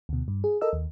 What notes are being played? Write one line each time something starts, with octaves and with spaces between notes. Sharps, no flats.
D2 B2
G2
G#4
A4 A#4 D#5 E6
D#2